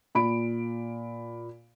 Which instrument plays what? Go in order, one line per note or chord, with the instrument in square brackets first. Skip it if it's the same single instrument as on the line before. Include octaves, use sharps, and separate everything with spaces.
[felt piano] A#2 B5 D7